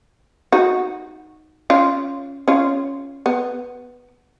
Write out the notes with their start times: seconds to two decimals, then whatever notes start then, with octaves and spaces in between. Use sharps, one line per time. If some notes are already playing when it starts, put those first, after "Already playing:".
0.52 D#4 F#4
1.70 C#4 F4
2.48 C#4 F4
3.26 B3